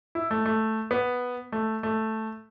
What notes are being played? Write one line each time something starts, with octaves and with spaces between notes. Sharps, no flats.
E4
A3
A3
B3
A3
A3